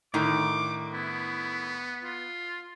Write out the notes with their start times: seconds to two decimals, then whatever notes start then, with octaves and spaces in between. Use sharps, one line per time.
0.14 A2 D3 D#3 D#4 D6
0.94 B3 E4
2.03 F4